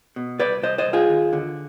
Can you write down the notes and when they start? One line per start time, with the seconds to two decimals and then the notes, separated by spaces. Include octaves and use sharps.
0.16 B2
0.39 C2 B4 D5
0.62 C2 C5 D#5
0.78 C5 D#5
0.86 C2
0.93 F4 G#4
1.09 D#2
1.33 D3